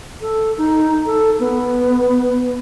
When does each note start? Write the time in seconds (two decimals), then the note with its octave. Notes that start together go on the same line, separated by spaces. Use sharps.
0.21 A4
0.58 D#4
1.06 A4
1.40 B3